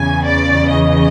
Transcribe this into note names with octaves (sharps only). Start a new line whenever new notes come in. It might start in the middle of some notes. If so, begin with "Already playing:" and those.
Already playing: E2 C#3 E3 G#5
D5
D#5